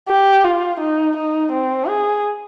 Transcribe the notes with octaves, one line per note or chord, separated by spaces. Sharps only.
G4
F4
D#4
D#4
C4
G#4